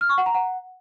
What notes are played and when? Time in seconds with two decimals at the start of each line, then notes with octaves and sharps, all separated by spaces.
0.01 F6
0.09 C#6
0.18 F#5
0.26 A#5
0.34 F#5